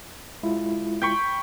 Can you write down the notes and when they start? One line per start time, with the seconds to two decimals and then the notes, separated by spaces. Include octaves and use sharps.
0.43 G#3 E4 F4
1.02 G5 B5 C#6